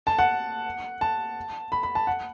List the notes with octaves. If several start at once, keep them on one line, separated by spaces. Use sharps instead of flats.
A5
F#5
A5
B5
B5
A5
F#5